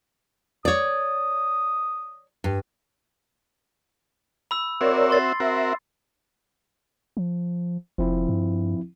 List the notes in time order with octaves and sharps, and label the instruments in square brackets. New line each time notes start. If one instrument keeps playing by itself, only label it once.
[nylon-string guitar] C#5 D5 [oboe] D#6
[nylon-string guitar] G2
[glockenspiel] B5 E6
[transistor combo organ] C4 F#4 E5 [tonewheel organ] A#4 C#5 D5
[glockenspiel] C6 A6 C7
[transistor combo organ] C4 F#4 A#4 [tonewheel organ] E5
[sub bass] F3
[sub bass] F1 [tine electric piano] F3 C4 E4
[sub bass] G2